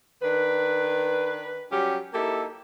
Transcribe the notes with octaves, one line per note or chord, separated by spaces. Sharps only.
D#3 D4 B4
F#3 G3 C#4 G4
A#3 D#4 E4 G4 A4